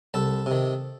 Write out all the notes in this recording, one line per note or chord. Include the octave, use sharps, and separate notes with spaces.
C2 A4 A5
C3 D#3